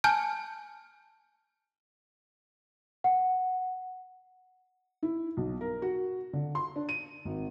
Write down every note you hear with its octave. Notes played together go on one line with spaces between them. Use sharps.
G#5 A5 F6 G6
F#5
E4
B1
A#4
F#4
D3
C6
D4
D#7
G#1